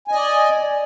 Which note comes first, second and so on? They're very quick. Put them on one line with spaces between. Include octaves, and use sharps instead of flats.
G#5 D#5 D5